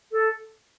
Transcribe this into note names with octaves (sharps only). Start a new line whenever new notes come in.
A4